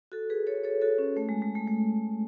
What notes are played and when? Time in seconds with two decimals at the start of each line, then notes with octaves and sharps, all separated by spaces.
0.12 F#4 A4
0.30 G#4 B4
0.47 A4 C#5
0.64 A4 C#5
0.81 F#4 A4
0.98 C#4
1.17 A3
1.29 G#3
1.42 G#3
1.55 A3
1.67 A3